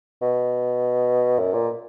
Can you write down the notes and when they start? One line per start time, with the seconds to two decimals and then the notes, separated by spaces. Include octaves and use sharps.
0.22 B2
1.39 F#2
1.54 A#2